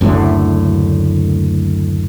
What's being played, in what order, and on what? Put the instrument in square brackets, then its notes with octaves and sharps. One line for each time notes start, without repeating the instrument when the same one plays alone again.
[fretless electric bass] F#1 D2 A2 D3